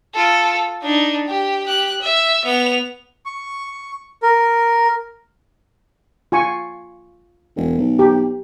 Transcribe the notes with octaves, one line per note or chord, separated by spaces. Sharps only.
F4 A4
D4 D#4
G4
G4 F#6
E5
B3 F7
C#6
A#4
F4 G#5 C#6
E1
B1
G4